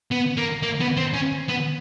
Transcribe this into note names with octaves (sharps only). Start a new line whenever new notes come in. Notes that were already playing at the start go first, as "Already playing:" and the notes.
B3
A#3
A#3
B3
C4
C#4
B3